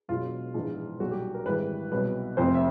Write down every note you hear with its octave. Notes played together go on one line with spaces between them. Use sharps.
E1 E2 B2 F#3 F4
A#1 G#2 E3
B1 A#2 G3 F#4
G4
A#4
G#1 G#2 E3 G3 B4
C2 B2 F#3 B4
F1 F2 C3 C5
E5